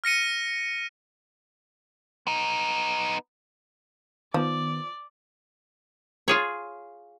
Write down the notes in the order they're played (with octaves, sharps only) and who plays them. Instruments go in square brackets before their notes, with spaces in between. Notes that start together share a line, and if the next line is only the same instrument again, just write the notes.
[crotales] F6 A#6 C#7 D#7
[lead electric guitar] B3 D#4
[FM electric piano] D#3 B3 [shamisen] F3 [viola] D5
[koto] F4 G#4 C#5